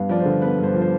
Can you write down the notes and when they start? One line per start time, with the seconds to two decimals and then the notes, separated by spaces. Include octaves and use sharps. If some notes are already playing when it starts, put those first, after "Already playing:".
Already playing: G2 B3 F5
0.09 F3 D5
0.20 C5
0.25 D3
0.42 B3 B4
0.58 G2
0.64 C5
0.74 F3
0.81 C5